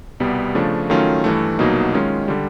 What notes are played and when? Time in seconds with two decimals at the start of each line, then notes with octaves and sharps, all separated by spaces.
0.20 C2 B2 G3 B3
0.55 C#3 F3 A3 D4
0.90 D#3 F#3 A3 C#4 F4
1.24 G2 E3 A3
1.59 C2 B2 F#3 A#3 D#4
1.94 D#3 G#3 C#4 F4
2.28 D3 G3